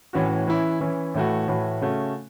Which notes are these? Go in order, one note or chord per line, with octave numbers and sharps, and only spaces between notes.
A2 E3 C#4 F#4
E3 C#4 E4
E3 C#4 E4
A2 E3 A3 F#4
A2 E3 A3 F#4
C#3 A3 C#4 F#4